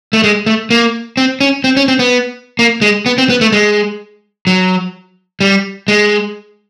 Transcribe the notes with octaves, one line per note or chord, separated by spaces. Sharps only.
A3
G#3
A3
A#3
C4
C#4
C4
C#4
C4
B3
A#3
G#3
B3
C4
B3
A3
G#3
F#3
G3
G#3